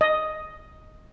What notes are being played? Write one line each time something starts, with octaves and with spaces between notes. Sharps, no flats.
D#5